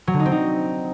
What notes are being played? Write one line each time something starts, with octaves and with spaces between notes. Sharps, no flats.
F#3
D3
D#4
C4
D#4